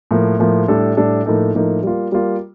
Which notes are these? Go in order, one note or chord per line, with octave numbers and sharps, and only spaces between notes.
A2 F3 A#3
A2 F3 A#3
A2 G3 D4 A4
A2 G3 D4 A4
A2 F3 A#3 D#4 A4
A2 F3 A#3 D#4 A4
G3 A#3 F4
G3 A#3 F4